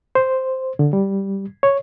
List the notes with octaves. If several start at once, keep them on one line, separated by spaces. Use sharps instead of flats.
C5
D3
G3
C#5